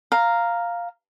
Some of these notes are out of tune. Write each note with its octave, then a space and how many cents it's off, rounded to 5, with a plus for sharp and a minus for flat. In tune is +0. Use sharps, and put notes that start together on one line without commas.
F5 +0 A#5 +0